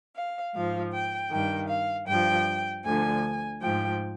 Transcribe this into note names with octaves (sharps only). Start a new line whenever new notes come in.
F5
G#2 F3 F5
G5
G2 D#3 G5
F5
G2 F3 G5
D2 D3 F3 G#5
G#2 F3 G5